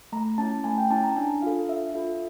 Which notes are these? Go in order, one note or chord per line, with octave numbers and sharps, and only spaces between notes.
A3 A#5
C#4 E4 A5
A3 G#5
G5
C#4 E4 A5
A#5
D4 G#5
F4 A4 F5
D4 E5
F4 A4 E5